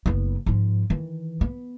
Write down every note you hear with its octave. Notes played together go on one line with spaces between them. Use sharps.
F#1 B3
G#2 F3
D#3 E3
B3